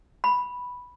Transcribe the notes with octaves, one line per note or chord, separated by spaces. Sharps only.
B5